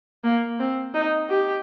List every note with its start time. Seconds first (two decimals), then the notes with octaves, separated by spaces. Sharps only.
0.24 A#3
0.60 C4
0.94 D#4
1.30 G4